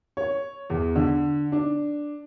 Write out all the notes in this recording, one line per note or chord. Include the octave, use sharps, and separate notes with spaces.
C#5
E2
D3
D4